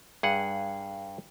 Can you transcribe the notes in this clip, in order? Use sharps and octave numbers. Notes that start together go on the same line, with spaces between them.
G2 G#4 F#5